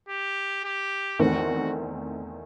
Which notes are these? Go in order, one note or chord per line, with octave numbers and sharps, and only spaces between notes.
G4
G4
E2 D#3 A3 C4 F#4